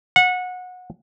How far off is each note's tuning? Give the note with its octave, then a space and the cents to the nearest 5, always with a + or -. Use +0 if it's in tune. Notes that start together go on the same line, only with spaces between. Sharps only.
F#5 -25